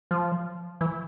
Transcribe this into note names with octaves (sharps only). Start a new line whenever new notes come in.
F3
E3